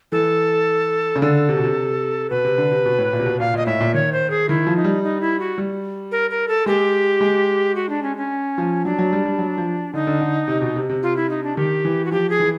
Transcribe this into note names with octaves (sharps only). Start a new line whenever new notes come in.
E3 A4
C#3
D3 A4
C3
B2
C3
B2 B4
C3
D3
C3
B2
A2
A#2
C3
B2
A#2 F5
A#2 D#5
A2 E5
A#2
D#3 C#5
C5
G#4
D#3 E4
F3
D#4
G3
D#4
E4
F#4
G3
A#4
A#4
A4
G#3 G4
G#3
F#4
D4
C#4
C#4
F3
F#3 D4
F#3
G3
G3
F#3
F3
D3 D#4
D3
D3
C3
B2
C3
C3
F4
E4
D#4
D4
D#3 G4
E3
F#4
F3 G4
G#4
E3